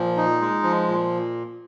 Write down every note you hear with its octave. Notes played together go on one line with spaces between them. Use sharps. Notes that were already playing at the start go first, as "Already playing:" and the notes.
Already playing: A#2 F3
D#4
G#3
F3
A#2